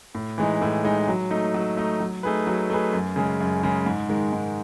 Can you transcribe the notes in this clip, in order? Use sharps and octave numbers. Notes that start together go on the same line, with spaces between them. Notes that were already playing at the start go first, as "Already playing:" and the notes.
A2
E3 G#3 D#4
A2
E3 G#3 D#4
F#3
A3 D#4
F#3
A3 D#4
F#3
A3 D#4 G#4 B4
F#3
A3 D#4 G#4 B4
F#2
C#3 G#3
F#2
C#3 G#3
G#2
D#3 G#3
G#2